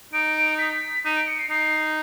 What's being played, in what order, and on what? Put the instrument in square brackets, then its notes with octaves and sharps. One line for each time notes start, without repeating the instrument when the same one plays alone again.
[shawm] D#4 [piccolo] D7
[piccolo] B6
[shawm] D#4 [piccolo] D#7
[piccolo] D7
C#7
C7
[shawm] D#4 [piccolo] C7